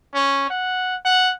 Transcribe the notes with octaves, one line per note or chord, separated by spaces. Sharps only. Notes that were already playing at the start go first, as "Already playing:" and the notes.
C#4
F#5
F#5